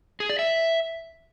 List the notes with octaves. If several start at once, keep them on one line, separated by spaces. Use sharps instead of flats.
G#4
D5
E5